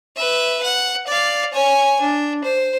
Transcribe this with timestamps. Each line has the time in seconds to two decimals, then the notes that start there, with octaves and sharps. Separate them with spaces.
0.16 B4 E5
0.64 F#5
1.07 D5 F5
1.53 C#5 G#5
2.01 D4
2.44 C5